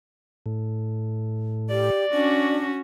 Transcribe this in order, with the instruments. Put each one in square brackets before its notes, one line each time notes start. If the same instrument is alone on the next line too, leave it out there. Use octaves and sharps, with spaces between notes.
[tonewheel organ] A2
[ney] G4 [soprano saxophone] D5
[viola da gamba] C#4 F#4 [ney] D4